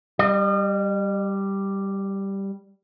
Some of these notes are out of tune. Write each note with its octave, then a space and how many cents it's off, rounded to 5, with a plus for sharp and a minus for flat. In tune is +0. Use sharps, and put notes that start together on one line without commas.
G3 +0 D#5 -45